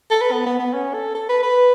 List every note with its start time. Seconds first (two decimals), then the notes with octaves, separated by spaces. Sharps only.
0.11 A4
0.21 B4
0.32 B3
0.46 B3
0.59 B3
0.73 C#4
0.94 A4
1.15 A4
1.29 B4
1.43 B4